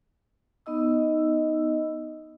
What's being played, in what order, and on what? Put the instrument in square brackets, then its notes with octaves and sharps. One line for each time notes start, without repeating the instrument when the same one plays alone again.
[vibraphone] B3 D#4 D#5 E6